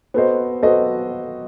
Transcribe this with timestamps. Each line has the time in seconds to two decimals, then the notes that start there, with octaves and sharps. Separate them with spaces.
0.14 B3 F#4 A4 C5 D#5
0.63 B3 F#4 A4 C5 D#5